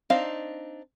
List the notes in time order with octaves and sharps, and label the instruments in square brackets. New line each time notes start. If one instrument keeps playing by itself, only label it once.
[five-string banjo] C4 D4 D#4 F5